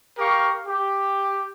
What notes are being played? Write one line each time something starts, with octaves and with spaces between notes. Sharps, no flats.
G4 A#4 F5 C#6
G4